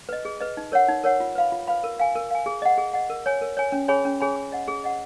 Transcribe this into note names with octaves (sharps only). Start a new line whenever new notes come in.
B4 D#5
G#4
B4 D#5
D#4
A#4 C#5 F#5
D#4
A#4 C#5 F#5
F4
B4 F5 B5
F4
B4 F5 B5
A#4
F5 G#5
A#4
F5 G#5
G#4
D#5 F#5
G#4
D#5 F#5
A#4
C#5 G#5
A#4
C#5 G#5
C#4
G#4 C#5 G#5 B5
C#4
G#4 C#5 G#5 B5
G#4
D#5 F#5
G#4
D#5 F#5